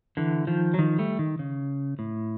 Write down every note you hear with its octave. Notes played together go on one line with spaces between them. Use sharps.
D3 E3
D#3 F3
F#3
D#3 F3
G3 A3
D#3
C#3
A2